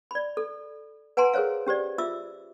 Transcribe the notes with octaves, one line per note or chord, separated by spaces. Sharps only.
D5 B5
A4
B4 F#5 G#5 A#5 C6
G#4 A#4 C5 C#5 F5
C#4 G4 C5 D5
F4 E5 D6 E6